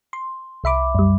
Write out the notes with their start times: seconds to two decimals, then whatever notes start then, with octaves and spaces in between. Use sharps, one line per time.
0.13 C6
0.64 C2 E5 B5 D6
0.95 F#2 G3